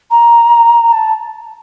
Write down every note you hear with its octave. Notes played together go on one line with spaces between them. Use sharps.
A#5
A5